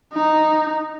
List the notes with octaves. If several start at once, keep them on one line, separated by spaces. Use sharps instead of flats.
D#4